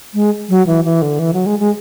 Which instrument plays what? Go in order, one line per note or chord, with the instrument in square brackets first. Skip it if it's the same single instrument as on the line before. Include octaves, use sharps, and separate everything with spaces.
[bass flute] G#3
F#3
E3
E3
D3
E3
F#3
G#3
G#3